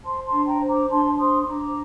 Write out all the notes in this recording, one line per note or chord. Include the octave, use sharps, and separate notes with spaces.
C5 A5 C6
A5 C6
D4
G5 A#5
C5
A#5 D6
D4 A5 C6
C5 C6 D#6
C6
D4 A#5 D6